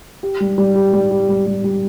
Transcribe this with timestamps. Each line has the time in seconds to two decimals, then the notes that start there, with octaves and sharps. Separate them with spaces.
0.23 G4
0.40 G3
0.58 G3
0.75 G4
0.93 G3
1.11 G4
1.29 G3
1.46 G3
1.64 G3